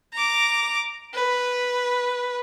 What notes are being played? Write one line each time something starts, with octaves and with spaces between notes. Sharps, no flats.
A#5 D6
B4